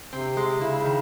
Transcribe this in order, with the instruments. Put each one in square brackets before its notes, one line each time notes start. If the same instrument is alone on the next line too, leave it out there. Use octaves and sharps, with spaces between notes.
[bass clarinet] C3 [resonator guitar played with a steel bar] C4
[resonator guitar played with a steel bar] G#3
[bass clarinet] C#3 [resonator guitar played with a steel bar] E4
[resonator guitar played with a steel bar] D#3